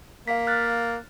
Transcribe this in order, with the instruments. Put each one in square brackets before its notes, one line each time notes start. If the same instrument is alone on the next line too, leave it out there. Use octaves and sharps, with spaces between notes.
[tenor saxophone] A#3 [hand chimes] F5 B6
[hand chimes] F6 F#6 A6